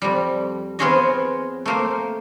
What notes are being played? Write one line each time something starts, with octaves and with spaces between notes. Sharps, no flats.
F2 G3
B3 C4 F4 G#4 C#5 D#5
A3 A#3 C5